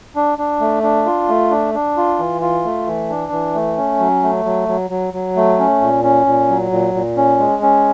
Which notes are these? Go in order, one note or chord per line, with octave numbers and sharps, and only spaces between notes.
D4
D4
A3
D4
F4
A3
D4
D4
F4
E3
F4
A3
E3
D4
E3
A3
C#4
F#3
A3
F#3
F#3
F#3
F#3
A3
C#4
A#2
C#4
A#2
F#3
A#2
A#2
C#4
G#3
C#4